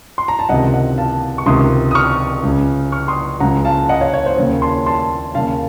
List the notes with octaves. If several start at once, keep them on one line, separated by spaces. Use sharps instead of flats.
C6
A#5
A5
C#2 C3 D#3 D#5 F#5
D#5 F#5
F5 A5
C#6
C#2 C3 D#3 C6 D#6
D#6
C#6 F6
C#2 C#3
C#6 F6
C6 D#6
C#2 C#3 F#5 A#5
F5 A5
D#5 F#5
C#5 F5
C#5
C5
D#2 C#3 C#5
A5 C6
A5 C6
D#2 C#3 F5 A5